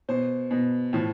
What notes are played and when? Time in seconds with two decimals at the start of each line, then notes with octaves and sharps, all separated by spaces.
0.09 B2 C5
0.51 B2
0.93 A2 F3